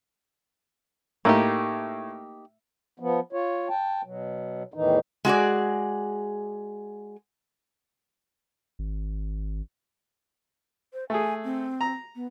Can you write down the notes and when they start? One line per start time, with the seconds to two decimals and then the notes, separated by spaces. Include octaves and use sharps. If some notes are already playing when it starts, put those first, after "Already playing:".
1.25 A2 A#3 D#4 G4
2.99 F3 B3
3.33 F4 C#5
3.69 G5 A5
4.04 B2 F#3
4.74 E2 A2 D#3 E3 D#4
5.25 G#3 F#4 G#4 D5
8.79 G#1
10.94 C5
11.10 A3 G#4 G#5
11.44 C4
11.81 A#5
12.16 B3